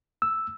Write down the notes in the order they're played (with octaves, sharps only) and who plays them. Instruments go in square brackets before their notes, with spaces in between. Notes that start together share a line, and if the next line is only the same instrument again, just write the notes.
[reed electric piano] E6